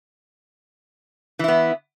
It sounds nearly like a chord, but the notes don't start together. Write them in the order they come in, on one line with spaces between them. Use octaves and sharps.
E3 E4 B3